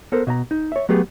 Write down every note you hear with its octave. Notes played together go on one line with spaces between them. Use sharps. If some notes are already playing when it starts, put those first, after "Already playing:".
B3 A4 A#4 C5
B2 E5 A#5
D#4
C#5 E5
F#3 A3 B3 G4 G#4